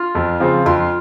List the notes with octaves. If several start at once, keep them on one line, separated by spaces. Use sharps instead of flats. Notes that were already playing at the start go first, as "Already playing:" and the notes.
Already playing: F4
F2
C#3 F3 C4
F2 F4